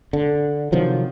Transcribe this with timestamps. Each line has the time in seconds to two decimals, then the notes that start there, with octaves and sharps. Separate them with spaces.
0.13 D3
0.72 C3 D#3 F3 F#3